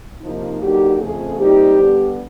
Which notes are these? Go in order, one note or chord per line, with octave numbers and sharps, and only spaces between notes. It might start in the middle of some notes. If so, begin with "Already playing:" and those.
C3 F3 A#3 D#4
D3 F#3 A#3 D#4 G4
F2 C#3 F3 A3 C4 G#4
A#2 G3 C4 D#4 G4
D3 G3 B3 D4